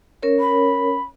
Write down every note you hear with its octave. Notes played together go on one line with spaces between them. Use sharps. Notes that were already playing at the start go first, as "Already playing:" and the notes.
C#4 A#4 C#5
B5